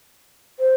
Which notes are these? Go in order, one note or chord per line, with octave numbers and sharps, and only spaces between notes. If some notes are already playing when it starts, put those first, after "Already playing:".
C5